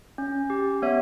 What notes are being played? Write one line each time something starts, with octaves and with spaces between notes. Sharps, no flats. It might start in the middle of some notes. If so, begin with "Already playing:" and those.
C#4
G4
B3 C#5 E5